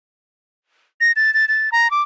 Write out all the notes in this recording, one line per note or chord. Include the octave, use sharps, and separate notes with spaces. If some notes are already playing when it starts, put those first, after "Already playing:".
A#6
A6
A6
A6
A#5
D6